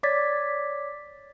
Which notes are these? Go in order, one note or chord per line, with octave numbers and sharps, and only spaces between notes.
C#5 D5 D6 G#6 A6 B6